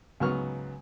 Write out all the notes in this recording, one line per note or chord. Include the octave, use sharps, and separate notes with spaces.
C#2 G#2 F#3 B3 C#6 F6